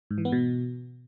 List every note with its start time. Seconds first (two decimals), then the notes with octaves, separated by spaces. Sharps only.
0.11 G#2
0.18 E3
0.25 B3
0.32 B2